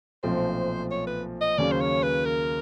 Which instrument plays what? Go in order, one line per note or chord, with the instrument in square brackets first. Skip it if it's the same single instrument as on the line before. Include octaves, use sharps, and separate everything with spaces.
[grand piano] B1 A#2 F3 A3 C4 [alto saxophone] C5
[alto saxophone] C#5
B4
D#5
[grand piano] D#2 C#3 F#3 A#3 C#4 [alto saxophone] D5
[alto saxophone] C5
C#5
B4
A#4